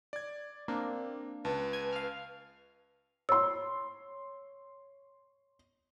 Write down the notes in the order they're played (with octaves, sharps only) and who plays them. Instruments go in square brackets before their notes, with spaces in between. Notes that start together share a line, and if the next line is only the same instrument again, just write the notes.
[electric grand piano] D5 G#6
[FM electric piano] A#3 D4 [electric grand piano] C4
[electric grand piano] C#2 A5 [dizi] B4
[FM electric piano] G#5 G#6
F5 F6
[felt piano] C#5 C6 [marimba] E6